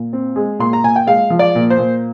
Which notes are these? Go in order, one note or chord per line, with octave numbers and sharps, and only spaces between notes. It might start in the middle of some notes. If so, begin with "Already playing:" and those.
Already playing: A#2
C4
G#3
A#2 C6
A#5
A#2 G#5
G5
G#3 F5
F3
D5
A#2
C5
A#2